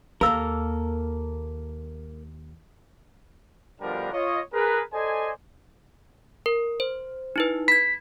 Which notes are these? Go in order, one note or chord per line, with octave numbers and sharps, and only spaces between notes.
D#2 A#3 A4 A#4 F5 E6
B2 D3 F3 G3 D4 A#4
F4 C#5 D#5
G#4 A#4 B4
A4 C5 D5 D#5 G#5
A#4
C5
D#4 E4 B4
B5 G#6 B6